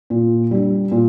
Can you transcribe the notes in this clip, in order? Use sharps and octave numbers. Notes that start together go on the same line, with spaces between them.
A#2
G3 D4
A#2